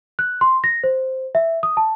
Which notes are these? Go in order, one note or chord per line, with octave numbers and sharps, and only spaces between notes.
F#6
C6
A#6
C5
E5
D#6
A5